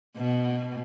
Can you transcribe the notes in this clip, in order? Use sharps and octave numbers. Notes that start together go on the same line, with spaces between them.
B2